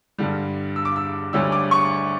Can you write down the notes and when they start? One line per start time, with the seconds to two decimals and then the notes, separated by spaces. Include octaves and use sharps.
0.18 G2 D3 G3
0.76 E6
0.85 D6
0.96 E6
1.33 D2 D3 G3 C#4 E6
1.52 D6
1.71 C#6